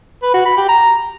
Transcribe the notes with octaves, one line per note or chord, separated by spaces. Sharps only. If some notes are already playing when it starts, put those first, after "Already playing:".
B4
F#4
B5
G4
A#5